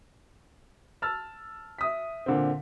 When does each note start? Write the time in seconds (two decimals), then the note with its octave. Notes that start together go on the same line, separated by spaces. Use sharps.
1.02 A5 E6 F6 A6
1.79 E5 D#6 B6
2.26 A#2 D3 C4